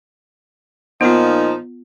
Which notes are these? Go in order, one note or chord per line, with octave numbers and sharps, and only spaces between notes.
A#2 F3 B3 D#4 F4